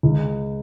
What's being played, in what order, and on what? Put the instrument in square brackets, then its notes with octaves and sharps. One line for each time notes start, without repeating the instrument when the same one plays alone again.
[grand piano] C#2